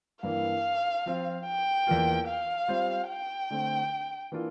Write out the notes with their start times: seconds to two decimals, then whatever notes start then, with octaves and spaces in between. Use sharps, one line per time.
0.23 G2 E3 A#3 F5
1.06 F3 C4 F4
1.46 G5
1.87 E2 E3 A#3 F4
2.28 F5
2.68 G3 C4 F4 C5
3.09 G5
3.50 D3 A3 C4
4.32 E3 A#3 D4 F4